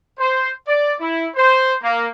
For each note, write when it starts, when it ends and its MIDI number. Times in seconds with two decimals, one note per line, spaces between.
0.19 0.50 72
0.67 0.94 74
1.00 1.27 64
1.36 1.73 72
1.82 2.07 58